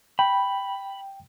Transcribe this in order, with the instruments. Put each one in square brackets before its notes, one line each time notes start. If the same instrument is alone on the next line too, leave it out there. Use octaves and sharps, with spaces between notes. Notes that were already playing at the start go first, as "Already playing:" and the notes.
[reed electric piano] G5 [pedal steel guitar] B5